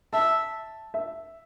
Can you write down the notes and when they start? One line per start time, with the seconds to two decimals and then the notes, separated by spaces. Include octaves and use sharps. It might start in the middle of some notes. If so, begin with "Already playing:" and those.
0.13 E5 A5
0.94 E5